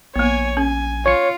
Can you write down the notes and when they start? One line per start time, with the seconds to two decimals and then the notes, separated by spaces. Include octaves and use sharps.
0.16 A#1 A#3 B3 C#5 G#5
0.57 C#4 G#5
1.06 F4 C#5 C#7